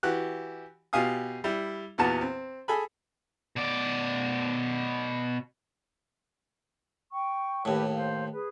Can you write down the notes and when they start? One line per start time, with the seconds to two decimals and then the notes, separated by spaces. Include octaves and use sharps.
0.03 E3 F#4 G4 F#6
0.93 B2 F4 G4 F5 G#5 D#6
1.44 G3 E4
1.98 E2 A#2 B3 F#4 A5 A#5
2.21 C4
2.68 G#4 A4 G#5 B5
3.56 B2 D5
7.12 G5 C#6
7.65 D#2 A2 G4 B4 D#5
7.93 C5 F5
8.31 G#4 B4